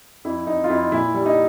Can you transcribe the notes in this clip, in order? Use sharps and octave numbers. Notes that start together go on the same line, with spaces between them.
F2 E4
F2 D#4
F4
F2 E4
A#2 E4
G3
D#4